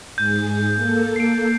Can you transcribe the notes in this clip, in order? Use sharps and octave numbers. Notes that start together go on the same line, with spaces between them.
G#2 G#4 G6
A#3 A4
C7 D7